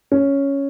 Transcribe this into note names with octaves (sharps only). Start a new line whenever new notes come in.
C#4